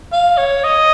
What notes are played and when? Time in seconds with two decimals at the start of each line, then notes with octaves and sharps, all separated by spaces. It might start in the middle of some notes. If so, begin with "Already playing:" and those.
0.13 F5
0.37 C#5
0.64 D#5